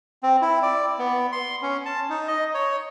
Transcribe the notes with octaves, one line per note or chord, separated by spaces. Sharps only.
C4
E4
D5
B3
C6
C#4
A5
D#4
D#5
C#5